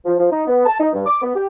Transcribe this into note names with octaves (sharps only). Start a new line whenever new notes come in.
F3
F3
D#4
B3
A5
D#4
G2
D6
B3
G4